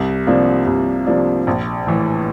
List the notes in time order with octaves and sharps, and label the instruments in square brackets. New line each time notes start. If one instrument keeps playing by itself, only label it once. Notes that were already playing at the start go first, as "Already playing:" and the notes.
Already playing: [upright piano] C2
C3 F3 A#3 D4
C2
C3 F3 A#3 D4
A#1
A2 E3